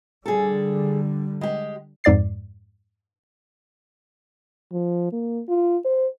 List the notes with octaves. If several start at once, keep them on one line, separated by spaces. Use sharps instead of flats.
D3 G3 G#4 A4
G#3 G4
F2 G#2 D5 A6 C7
F3
A#3
F4
C5